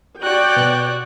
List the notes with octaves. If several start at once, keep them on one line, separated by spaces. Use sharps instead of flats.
F#4 C#5 D5 G5 F#6
B2